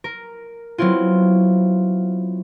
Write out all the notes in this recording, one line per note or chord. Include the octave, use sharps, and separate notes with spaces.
A#4
F#3 B3 C4 E4 F4